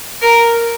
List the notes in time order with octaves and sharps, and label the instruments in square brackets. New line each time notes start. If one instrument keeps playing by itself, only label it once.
[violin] A#4